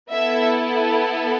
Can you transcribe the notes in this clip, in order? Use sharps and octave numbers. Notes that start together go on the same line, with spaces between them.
B3 E4 A4 E5